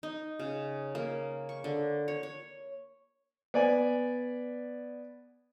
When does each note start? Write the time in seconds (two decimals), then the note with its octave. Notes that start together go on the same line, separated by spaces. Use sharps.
0.03 D#4
0.39 C#3
0.95 A#3
1.49 C#6
1.64 D3
2.08 C#5
2.23 C#5
3.54 B3 D5 G#5